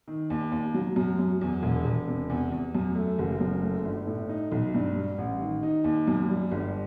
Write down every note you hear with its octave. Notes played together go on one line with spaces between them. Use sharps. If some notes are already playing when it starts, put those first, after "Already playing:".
D#3
D#2
D#2
F#3
F#2
F#2
E2
E1
E1
C3
E2
E2
F#2
A3
F#1
F#2
A3
G1
A2
D#4
B1
G2
G3
A1
D#3
D#4
D#2
F#2
G3
G1